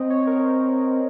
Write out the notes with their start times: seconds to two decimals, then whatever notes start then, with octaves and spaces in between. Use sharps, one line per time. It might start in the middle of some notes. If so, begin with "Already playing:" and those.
Already playing: C4 D#5
0.10 C#5
0.27 A#4
0.45 C5